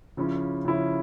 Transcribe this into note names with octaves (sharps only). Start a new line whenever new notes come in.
C#3 F3 C#4 E4
C#3 F3 C#4 E4